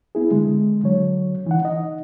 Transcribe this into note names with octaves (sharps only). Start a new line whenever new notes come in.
B3 E4 G#4
D3 G#3
D3 F#3 C#5
E3 D#4 F#5
D#4 D#5